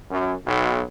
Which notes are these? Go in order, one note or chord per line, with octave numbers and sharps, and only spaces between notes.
F#2
B1